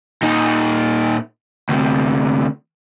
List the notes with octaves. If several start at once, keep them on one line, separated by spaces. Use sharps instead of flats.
A#2 D#4
D2 C3